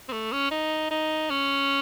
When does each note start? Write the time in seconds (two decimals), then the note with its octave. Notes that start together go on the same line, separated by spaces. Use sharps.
0.09 C4
0.13 A3
0.33 C#4
0.51 D#4
0.91 D#4
1.31 C#4